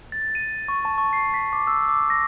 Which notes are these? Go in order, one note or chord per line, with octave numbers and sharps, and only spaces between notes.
A6
D#7
C#6
A5
C#6
C7
B6
D6
E6
D6
A#6